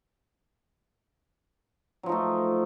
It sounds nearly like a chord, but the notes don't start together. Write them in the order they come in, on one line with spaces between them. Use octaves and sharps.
F#3 F3 D#4 A3